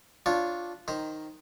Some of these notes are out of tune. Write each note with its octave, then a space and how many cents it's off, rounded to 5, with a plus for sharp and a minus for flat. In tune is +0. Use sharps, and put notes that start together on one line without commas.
D4 +0 F4 +0 C#5 -10
D#3 +0 C5 +0 A#5 +10